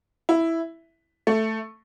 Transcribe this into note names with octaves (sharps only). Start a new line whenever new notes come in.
E4
A3